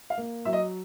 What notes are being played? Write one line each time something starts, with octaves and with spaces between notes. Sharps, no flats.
F5
A#3
F#3 E5
D#5